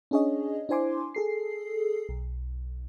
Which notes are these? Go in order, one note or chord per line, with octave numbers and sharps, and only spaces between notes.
C#4 D4 G#4 C#5 D#5
D4 E4 C5 G#5 C6 D6
G#4 A4 C7
B1